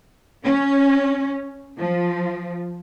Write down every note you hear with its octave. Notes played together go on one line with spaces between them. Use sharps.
C#4
F3